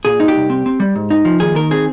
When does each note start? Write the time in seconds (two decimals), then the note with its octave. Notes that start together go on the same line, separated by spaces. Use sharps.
0.05 A#2 G#4
0.20 D#4
0.28 G4
0.36 C2
0.50 C4
0.66 C4
0.80 G3
0.95 G#2
1.10 D#4
1.25 F3
1.40 D#2 G#4
1.55 D#3 A#4
1.71 C4 G#4